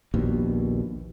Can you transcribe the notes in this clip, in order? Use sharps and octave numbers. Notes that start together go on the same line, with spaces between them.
A#1 D#2 B2